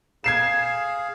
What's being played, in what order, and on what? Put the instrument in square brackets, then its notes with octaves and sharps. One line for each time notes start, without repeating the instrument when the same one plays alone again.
[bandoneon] G#4 F5 [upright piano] G#6 C7 E7